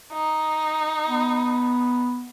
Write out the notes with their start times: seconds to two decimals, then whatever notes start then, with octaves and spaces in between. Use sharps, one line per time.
0.13 D#4
1.08 B3